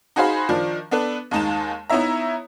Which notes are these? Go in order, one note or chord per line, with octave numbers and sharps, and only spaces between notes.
D#4 F#4 G#4 C5 F5 B5
D#3 F3 D4
B3 D4 A4 B4
D#2 G#3 D#4 A5 E7
B3 D#4 E4 C#5 E5 A#5